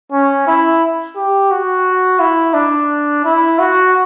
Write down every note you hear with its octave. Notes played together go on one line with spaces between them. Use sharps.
C#4
E4
G4
F#4
E4
D4
E4
F#4